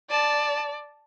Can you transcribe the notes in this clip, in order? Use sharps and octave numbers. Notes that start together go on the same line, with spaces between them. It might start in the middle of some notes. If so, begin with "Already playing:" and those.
D5 A5